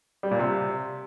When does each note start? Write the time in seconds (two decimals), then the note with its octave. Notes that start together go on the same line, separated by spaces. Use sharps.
0.23 G3
0.31 A#2
0.39 C3